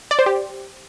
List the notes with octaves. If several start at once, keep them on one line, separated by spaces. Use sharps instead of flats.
D5
C5
G4